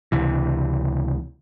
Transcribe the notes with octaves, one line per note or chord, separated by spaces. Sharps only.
C#2 C3 E3